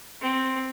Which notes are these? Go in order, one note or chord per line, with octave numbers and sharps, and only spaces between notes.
C4